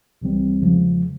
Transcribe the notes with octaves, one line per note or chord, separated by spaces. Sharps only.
C2 C3 E3 G3 C4
E2 C#3 F3 G#3